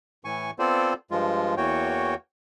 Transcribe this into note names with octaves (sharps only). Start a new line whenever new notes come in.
A2 E3 G#5 C#6
B3 C4 F4 A4 C5 D5
G2 F3 G#3 F4
E2 E3 A#3 F#4 C#5 G5